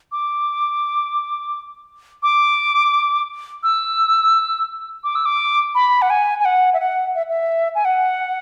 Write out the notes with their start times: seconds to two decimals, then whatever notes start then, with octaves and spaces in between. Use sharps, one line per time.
0.12 D6
2.23 D6
3.63 E6
5.04 D6
5.15 E6
5.25 D6
5.75 B5
6.02 F#5
6.10 G#5
6.40 G#5
6.45 F#5
6.74 E5
6.80 F#5
7.15 E5
7.29 E5
7.75 G#5
7.85 F#5